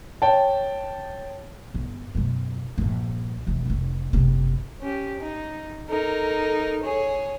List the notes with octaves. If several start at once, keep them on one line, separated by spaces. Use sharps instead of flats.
C#5 G5 A5
G1
F#2 B2
A#1 G2
E1 E3
F1 D#3
F#1 C3
C#4 G4
D#4
D#4 A4 A#4
G#4 C#5